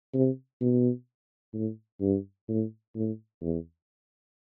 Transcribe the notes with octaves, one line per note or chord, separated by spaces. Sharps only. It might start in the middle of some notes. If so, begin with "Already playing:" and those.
C3
B2
A2
G2
A2
A2
E2